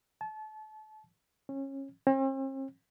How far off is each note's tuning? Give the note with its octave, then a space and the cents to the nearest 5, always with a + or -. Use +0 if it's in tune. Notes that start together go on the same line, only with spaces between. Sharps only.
A5 -30
C#4 -25
C4 +45